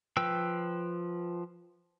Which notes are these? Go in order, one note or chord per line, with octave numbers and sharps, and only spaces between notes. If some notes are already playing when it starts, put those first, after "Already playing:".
F3 B4 G5 E6